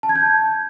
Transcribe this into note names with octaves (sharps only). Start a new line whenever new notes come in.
A5
G#6
G6